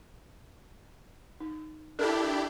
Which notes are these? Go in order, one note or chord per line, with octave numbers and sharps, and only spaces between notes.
D#4
D4 E4 G4 A4 A#4